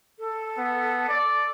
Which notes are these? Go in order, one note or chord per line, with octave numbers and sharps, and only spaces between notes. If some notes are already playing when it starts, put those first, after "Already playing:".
A4
B3
D5